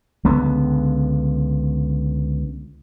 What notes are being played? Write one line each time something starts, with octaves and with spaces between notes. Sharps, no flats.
C#2 D3 B3